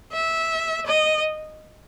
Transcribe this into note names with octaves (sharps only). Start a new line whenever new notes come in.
E5
D#5